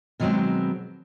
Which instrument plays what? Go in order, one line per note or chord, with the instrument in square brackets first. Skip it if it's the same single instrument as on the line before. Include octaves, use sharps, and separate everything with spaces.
[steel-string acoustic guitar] B2 D#3 F#3 G#3 B3 C4